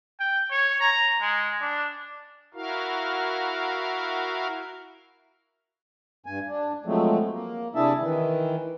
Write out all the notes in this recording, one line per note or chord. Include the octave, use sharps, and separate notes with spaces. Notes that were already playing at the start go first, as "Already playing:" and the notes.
G5
C#5
A#5
G#3
D4
E4 F#4 A#4 F5
G2 G#5
D4
F3 F#3 G#3 A3 C4
A#3
C3 D4 E4 G#4 E5 A5
D#3 E3